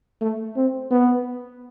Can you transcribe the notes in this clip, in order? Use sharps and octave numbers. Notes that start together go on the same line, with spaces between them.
A3
C4
B3